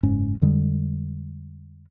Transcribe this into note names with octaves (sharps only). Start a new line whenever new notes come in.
F#1 G#2 C#4
F2 D3 G3 G#3